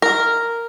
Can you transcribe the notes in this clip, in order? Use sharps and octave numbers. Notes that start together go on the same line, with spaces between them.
A#4